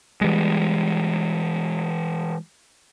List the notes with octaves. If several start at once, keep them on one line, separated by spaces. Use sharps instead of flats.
E3 G3 G#3